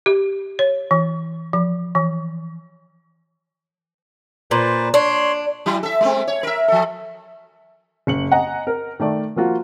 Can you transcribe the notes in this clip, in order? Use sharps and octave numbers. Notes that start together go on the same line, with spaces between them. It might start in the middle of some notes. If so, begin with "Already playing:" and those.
G4
C#5
E3
F3
E3
A#2 B4 C5 D5
D4 C#5 C6
F#3 E4
A4 E5
G#3 A3 C4
C#5
A#4 E5
F3 A4
F#1 C#7 F#7
D#5 F#5 G#5 A#5
A#4
D#3 A3 D5
F3 A#3 F4 F#4